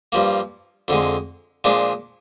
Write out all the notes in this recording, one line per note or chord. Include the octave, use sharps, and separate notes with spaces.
G2 F3 A#3
F2 D3 G#3
A#2 F3 G#3 D4